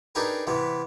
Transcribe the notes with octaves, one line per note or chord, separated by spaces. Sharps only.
D4 D#4 G4 G#4 A#4 B4
C3 E3 B3